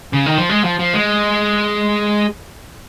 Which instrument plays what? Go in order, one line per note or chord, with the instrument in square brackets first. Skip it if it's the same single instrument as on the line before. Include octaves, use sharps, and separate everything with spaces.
[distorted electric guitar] C#3
D#3
F3
G#3
F3
F3
G#3